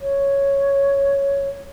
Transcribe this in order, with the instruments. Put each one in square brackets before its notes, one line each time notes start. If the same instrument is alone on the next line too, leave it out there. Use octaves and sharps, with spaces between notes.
[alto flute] C#5